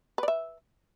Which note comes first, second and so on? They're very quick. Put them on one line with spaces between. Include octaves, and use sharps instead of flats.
B4 D5 E5